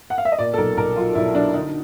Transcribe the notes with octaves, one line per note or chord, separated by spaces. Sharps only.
F#5
F5
E5
D#5
A#2 D5
A4
B1 A#4
B1 A#4
F#3 F4
B1 E4
F#3 D4
D3 D#4